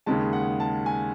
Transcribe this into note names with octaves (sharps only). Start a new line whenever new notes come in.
D#2 C#3 G#3 A5
F#5
A5
G#5